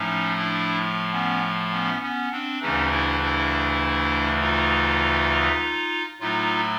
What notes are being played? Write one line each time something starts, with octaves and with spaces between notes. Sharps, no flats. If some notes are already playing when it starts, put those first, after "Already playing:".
Already playing: A2 F3 A3 C#4 D#4
D4 E4
B3 C#4
B3 C#4
B3 C#4
C4 D4
D2 C#3 E3 A3 C#4 D#4
D4 E4
D4 E4
D#4 F4
A2 F#3 A3 D#4 F4